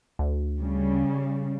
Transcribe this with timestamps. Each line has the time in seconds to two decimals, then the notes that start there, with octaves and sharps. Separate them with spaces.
0.19 D2
0.60 C#3 G3